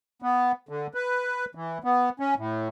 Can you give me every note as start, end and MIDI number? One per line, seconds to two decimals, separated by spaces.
0.22 0.52 59
0.69 0.87 50
0.94 1.45 71
1.55 1.78 52
1.84 2.09 59
2.20 2.34 61
2.38 2.68 45